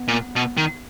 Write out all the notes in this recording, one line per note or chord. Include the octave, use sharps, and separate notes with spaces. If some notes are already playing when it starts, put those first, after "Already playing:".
Already playing: B3
A#2
B2
D#3